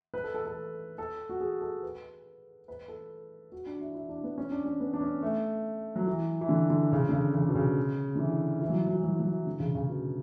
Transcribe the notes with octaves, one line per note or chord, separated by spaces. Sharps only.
B4
A4
A4
A4
A4
F#4
G#4
A4
B4
B4
A4
F#4
D4
E4
E4
D4
B3
C#4
D4
C#4
B3
D4
C#4
A3
F#3
E3
E3
D3
D3
C#3
D3
C#3
C#3
B2
C#3
D3
E3
E3
F#3
E3
F#3
E3
F#3
E3
F#3
E3
D3
C#3
C#3
B2